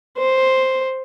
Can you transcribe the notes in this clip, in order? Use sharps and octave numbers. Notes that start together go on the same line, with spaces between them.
C5